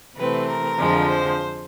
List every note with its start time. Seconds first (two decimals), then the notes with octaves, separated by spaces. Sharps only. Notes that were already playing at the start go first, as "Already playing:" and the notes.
0.18 C3 E3 A3 C4 B4
0.48 A#4
0.79 F2 D3 F3 G#3
1.10 C5